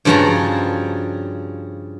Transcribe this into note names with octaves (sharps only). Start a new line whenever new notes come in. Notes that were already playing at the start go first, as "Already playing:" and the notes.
G2 C#3 F3 F#4 A5 A#5